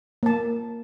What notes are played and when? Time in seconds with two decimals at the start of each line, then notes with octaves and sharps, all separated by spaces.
0.23 A#3 A5